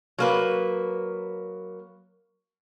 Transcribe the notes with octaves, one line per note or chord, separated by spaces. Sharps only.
F#3 A#3 B4